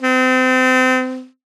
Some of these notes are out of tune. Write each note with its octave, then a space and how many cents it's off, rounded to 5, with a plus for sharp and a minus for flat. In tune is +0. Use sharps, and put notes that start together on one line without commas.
C4 -30